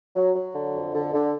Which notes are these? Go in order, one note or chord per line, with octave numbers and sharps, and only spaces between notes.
F#3
F#3
D3
F2
D3
D3